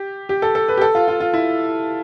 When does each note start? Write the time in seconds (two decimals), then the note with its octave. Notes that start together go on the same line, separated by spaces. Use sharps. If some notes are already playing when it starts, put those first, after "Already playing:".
Already playing: G4
0.29 G4
0.42 A4
0.55 A4
0.68 B4
0.77 G4
0.81 A4
0.95 F4
1.08 F4
1.20 F4
1.34 E4